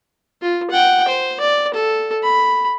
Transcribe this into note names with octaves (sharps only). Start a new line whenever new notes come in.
F4
F#5 G5
C5
D5
A4
B5